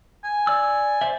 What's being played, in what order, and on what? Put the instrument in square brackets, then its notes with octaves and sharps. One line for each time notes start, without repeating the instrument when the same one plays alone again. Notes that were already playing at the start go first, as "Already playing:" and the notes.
[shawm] G#5
[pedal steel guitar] D5 E6
C5 D5 E5